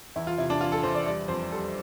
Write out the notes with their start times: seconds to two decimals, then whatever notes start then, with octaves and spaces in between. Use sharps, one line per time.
0.16 E2 E4
0.27 F4
0.37 C3 E4
0.50 D4
0.61 E3 F4
0.72 A4
0.83 E2 C5
0.95 D5
1.06 G3 D5
1.28 F2 C5
1.51 G3 A4